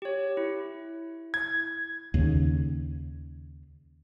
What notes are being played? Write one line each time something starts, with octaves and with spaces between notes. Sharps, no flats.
G4 C#5
E4
G#6
D#2 C#3